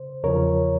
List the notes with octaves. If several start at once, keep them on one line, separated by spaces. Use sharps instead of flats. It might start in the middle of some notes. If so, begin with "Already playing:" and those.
Already playing: C#3 C5
E2 C#3 F3 A#4 C#5